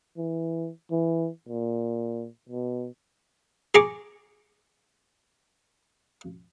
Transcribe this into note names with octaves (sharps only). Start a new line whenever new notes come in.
E3
E3
A#2
B2
G#4 A#5 C#6 D6